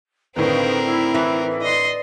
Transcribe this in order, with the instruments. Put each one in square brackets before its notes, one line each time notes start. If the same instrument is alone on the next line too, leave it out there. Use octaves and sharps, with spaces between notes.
[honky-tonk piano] A2 D3 D#3 [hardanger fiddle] C4 A#4 [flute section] D#4 B4 F5
[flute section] E4
[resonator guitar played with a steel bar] E3
[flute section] D5 [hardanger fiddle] D#5 C6